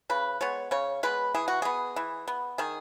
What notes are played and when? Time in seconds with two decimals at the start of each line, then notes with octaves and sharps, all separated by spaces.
0.10 C#3 B4
0.41 G#3 B3 C#5
0.71 C#3 C#5
1.03 G#3 B3 B4
1.34 E3 G#4
1.48 F#4
1.62 B3 G#4
1.96 E3
2.28 B3
2.58 D#3 G#4